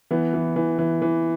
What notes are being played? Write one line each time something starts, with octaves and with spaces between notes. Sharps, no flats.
E3 B3
E3
E3
E3
E3